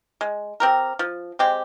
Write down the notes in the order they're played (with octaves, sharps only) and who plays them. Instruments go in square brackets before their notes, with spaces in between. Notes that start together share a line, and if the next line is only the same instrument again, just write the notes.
[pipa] G#3
C4 G4 A#4
F3
G#3 C4 G4